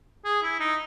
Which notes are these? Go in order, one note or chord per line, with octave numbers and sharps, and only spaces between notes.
G#4
E4
D#4